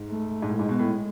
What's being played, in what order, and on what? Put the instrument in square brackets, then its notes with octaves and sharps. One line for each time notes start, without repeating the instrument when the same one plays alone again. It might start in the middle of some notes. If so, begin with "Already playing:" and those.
Already playing: [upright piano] G#2
[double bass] A3
[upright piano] G#2
[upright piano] A2 [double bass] G#3
[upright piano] G#2
B2
A2